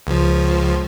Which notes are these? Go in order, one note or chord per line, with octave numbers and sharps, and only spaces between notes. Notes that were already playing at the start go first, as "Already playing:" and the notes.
C#2 F3